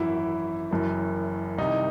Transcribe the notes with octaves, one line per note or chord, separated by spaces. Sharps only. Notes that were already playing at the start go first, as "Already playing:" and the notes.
Already playing: G#1 F#2 E3 E4
F#1 F#2 E3
C2 C3 D#3 D#4